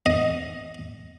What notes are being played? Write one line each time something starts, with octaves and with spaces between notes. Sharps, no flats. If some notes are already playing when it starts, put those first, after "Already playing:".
D#5